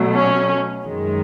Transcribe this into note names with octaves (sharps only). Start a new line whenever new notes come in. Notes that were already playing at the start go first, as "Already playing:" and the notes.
Already playing: B2 F#3 A3
C#4
F#2 D#3 G#3